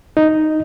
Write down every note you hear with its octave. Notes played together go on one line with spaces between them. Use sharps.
D#4